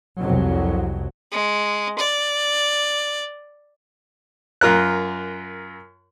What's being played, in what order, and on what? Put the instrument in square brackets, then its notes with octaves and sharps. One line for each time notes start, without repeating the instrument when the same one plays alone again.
[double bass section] C2 F2 F#3
[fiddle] G#3
D5
[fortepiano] F#2 F4 A#4 F#6